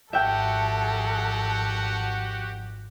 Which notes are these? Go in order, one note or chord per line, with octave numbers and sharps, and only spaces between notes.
G#1 F2 F#4 G4 A4 E5 F#5 G5